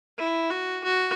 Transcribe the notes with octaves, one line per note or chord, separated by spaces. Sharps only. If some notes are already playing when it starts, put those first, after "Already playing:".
E4
F#4
F#4